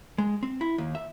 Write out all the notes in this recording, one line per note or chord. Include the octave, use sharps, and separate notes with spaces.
G#3
C4
E4
D#2
E5